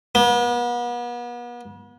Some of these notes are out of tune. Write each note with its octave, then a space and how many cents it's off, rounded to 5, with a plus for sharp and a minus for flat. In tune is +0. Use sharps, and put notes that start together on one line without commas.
B3 -40